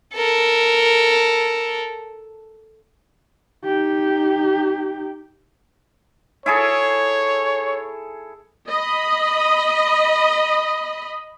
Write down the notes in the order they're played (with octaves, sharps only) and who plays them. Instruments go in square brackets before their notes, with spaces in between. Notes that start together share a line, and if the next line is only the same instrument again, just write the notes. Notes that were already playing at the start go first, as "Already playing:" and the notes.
[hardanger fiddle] A4 A#4
[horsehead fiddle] D#4 G4
[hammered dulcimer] E4 G#4 A4 [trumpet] C#5
[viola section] D#5 B5